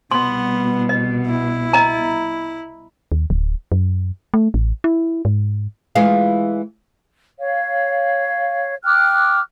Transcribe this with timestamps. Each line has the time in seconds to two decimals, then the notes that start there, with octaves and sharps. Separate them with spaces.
0.11 C2 B2 B3 C6
0.89 D#5
1.27 E4
1.73 D#5 A#5
3.12 D#2
3.30 D1
3.72 F#2
4.34 A3
4.54 A1
4.84 E4
5.25 G#2
5.95 E3 G#3 F4
7.40 C#5 F5
8.85 G5 D6 F6 F#6